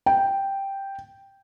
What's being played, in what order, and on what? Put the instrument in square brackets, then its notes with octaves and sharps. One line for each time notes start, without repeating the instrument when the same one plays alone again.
[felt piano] G5